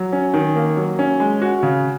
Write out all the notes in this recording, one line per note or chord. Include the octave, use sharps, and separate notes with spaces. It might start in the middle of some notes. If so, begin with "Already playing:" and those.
Already playing: F#3
C#4
D#3
A#3
F#3
C#4
G#3
F#4
C#3